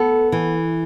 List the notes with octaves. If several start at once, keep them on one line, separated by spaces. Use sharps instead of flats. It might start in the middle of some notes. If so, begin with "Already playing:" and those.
Already playing: B3 A4
E3